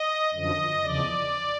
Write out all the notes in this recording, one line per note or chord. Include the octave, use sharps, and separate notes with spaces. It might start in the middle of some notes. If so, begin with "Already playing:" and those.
Already playing: D#5
F#2 D3 F3 D#5
E2 C#3 F3 D5